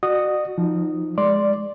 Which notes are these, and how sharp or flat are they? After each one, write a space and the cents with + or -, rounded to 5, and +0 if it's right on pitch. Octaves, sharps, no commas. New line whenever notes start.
F#4 +0 D5 +45 D#6 -5
F3 +0 D#4 +0
G#3 +0 D5 +0 C6 +0